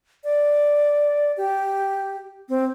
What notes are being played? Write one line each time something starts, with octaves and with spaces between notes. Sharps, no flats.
D5
G4
C4